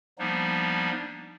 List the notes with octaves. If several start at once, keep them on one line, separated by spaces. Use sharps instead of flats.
F3 G3 A#3 B3 D4 D#4